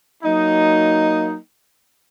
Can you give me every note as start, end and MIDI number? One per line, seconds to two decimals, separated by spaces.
0.24 1.36 54
0.24 1.36 58
0.24 1.36 63